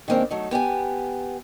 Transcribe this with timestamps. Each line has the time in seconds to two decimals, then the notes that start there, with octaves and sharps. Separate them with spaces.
0.08 D#3 G#3 A#3 C4 D4
0.30 F#3 A3 D#4
0.51 B3 G4 D5 G#5